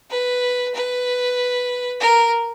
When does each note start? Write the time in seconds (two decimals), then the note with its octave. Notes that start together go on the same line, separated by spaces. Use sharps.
0.10 B4
0.74 B4
2.00 A#4